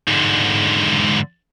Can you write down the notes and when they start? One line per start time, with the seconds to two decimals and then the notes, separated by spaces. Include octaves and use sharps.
0.07 G#2 D3